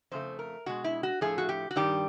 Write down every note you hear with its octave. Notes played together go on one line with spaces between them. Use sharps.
F2 C#3 A3 C5
A#4
B2 G#3 F#4
E4
F#4
A2 F3 A3 G#4
F#4
G4
F#4
G2 D#3 G3 G4